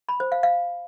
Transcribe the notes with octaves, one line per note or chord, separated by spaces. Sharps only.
B5
C5
F5
F5